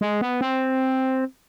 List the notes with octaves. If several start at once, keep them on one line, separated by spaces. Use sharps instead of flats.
G#3
B3
C4